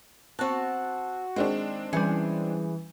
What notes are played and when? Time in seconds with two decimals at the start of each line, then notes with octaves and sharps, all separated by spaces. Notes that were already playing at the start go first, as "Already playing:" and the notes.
0.39 C4 F#4 A5
1.36 D#3 G#3 C4 D4
1.93 E3 G3 C#4 G#4